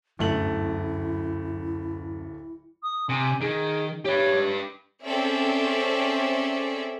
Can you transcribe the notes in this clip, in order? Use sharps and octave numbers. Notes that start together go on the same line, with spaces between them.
D1 G1 F#2 A2 A3 E4 F#7
D#6
C3 G#5
D#3 G#4
G4 B4 C#5
C4 C#4 G#4 A4 D5 E5